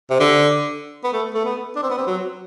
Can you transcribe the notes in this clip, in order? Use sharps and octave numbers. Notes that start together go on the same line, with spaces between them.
C3
D3
B3
A3
A3
B3
D4
C4
B3
C4
F#3